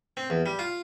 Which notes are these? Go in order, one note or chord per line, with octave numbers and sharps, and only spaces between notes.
C4
E2
G3
F4